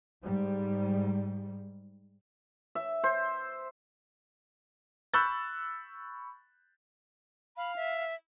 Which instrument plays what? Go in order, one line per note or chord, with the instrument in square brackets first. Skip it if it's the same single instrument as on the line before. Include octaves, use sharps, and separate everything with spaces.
[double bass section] G#2 G3
[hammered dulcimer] E5
C5
[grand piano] B5 C#6 E6 F#6 G6 A6
[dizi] F5 [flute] B5
[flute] E5